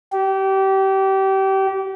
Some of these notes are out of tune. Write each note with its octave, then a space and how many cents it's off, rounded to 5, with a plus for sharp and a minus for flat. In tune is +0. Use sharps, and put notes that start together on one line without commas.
G4 -25